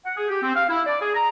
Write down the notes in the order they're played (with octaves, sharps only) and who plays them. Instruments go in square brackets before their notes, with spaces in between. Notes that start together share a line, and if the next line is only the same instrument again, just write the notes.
[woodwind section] F#5
G#4
G4
C4
F5
E4
D5
G#4
A#5